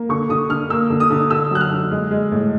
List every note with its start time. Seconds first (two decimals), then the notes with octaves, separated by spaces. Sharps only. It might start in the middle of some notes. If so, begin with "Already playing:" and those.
Already playing: A#3
0.09 D3 C#6
0.29 D3 D#6
0.50 D3 F6
0.70 A#3 E6
0.90 D3
1.00 D#6
1.10 D3
1.30 D3 E6
1.51 F#3 F#6
1.61 F6
1.71 D3
1.91 G#3
2.11 G#3
2.31 A2